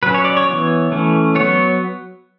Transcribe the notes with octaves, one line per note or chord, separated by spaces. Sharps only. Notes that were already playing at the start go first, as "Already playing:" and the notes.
F#3 C#4 B4
C#5
D5
C#5
E3 B3
E3 A3 C#4
F#3 B3 C#5